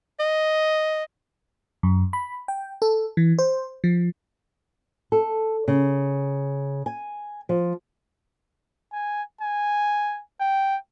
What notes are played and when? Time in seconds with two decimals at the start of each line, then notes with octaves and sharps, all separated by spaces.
0.19 D#5
1.83 F#2
2.13 B5
2.48 G5
2.82 A4
3.17 E3
3.39 C5
3.84 F3
5.12 A4
5.68 C#3
6.86 G#5
7.49 F3
8.93 G#5
9.41 G#5
10.41 G5